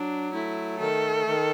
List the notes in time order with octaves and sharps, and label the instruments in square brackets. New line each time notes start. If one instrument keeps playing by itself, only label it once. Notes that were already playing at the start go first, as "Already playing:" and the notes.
Already playing: [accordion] F#3 [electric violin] D4
[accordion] A3 [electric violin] E4
[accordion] D#3 [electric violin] A4
[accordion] D#3